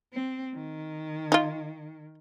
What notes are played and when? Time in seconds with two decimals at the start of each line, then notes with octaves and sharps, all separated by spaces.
0.13 C4
0.54 D#3
1.32 D#4 F4